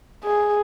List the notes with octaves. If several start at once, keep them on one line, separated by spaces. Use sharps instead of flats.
G#4